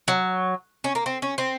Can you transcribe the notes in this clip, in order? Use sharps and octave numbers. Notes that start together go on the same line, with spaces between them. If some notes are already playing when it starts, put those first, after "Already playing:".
F#3
C#4
A#3
C4
C#4
C4